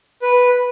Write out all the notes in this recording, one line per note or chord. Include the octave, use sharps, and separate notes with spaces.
B4